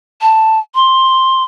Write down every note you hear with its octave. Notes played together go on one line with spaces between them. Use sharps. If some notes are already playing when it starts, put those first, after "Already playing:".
A5
C6